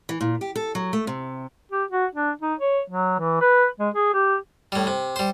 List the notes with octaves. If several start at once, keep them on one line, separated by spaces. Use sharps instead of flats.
E3
A#2
G4
A4
F#3
A3
C3
G4
F#4
D4
D#4
C#5
F#3
E3
B4
G#3
G#4
G4
A2 G3
C3
G3 C5